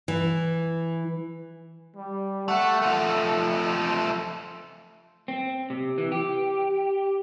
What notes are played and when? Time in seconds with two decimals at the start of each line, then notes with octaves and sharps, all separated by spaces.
0.08 E3
1.96 G3
2.48 A3 F#5
2.82 F3 A3 A4
5.28 C4
5.70 C3
5.98 E3
6.12 G4